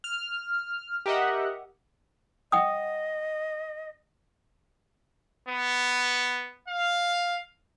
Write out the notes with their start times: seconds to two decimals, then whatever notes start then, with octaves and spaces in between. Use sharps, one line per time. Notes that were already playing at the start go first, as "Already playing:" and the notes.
0.04 F6
1.06 G4 A#4 D#5 E5 F#5
2.52 D#5 F#5 G5 D#6
5.49 B3
6.68 F5